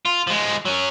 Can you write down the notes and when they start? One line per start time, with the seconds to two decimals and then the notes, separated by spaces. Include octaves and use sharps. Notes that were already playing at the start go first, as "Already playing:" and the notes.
0.06 F4
0.27 F3 G#3
0.65 F#3 C#4